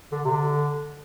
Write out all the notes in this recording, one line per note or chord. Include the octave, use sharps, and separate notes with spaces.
D3
C3
D3